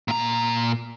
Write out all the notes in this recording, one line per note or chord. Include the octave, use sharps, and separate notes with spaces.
A#2 A#5